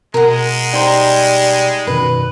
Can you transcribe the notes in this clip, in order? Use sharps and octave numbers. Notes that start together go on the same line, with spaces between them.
B2 G#3 A#4 F#5
G3 D#4 C5 A#5
F#2 B2 D#3 B4